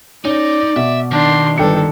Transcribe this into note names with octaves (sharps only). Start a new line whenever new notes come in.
C#4 D#4 D5
B2 E5
D#3 D4 C6
G1 D4 A4 G5 C#7